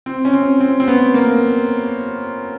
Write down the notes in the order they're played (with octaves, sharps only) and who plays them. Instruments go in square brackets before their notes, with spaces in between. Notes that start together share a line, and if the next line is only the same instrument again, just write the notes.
[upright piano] C4
C#4
C4
C4
C4
B3
A#3